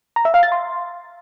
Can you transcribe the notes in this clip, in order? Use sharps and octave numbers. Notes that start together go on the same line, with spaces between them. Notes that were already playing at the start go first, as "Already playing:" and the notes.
A#5
E5
F5
A6
C6